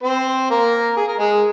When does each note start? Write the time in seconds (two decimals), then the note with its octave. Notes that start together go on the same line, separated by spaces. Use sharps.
0.03 C4 C5
0.50 A#3 A#4
0.97 G#4
1.08 A#4
1.19 G#3 G#4